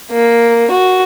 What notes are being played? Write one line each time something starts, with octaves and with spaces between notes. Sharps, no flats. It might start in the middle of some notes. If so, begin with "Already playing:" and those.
A#3
F#4